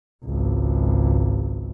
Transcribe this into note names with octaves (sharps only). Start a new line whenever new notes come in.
G#1 C#2